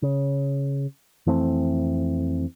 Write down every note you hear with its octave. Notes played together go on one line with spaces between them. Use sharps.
C#3
F2 E3 A3 C4